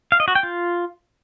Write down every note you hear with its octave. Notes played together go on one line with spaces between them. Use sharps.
F5
D#5
F#4
G5
F4